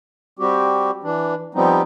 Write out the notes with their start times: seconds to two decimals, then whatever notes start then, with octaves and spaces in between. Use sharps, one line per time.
0.39 G3 C4 F#4 G4
1.03 E3 D4
1.55 F3 G3 B3 C4 D#4